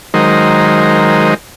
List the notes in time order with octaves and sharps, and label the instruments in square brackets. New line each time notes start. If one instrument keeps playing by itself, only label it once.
[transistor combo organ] D#3 F#3 G#3 D#4 A#4 C5